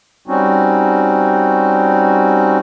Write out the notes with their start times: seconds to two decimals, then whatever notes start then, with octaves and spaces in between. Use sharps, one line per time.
0.28 G3 C4 C#4 D#4 F#4